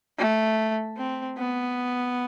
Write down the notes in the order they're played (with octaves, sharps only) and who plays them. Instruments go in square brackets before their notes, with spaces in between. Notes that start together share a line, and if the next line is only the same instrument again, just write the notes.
[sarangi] A3
C4
B3